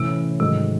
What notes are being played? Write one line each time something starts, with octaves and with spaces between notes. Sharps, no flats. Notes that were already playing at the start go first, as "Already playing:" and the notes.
Already playing: A2 C3 E3 A3 C#4
G#2 C3 D#3 F#3 A3